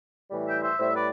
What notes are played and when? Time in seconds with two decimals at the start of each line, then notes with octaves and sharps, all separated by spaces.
0.31 A2 E3 G3
0.47 E5 G5
0.63 C5 E5
0.79 A2 G3 C5 E5
0.95 B4 D5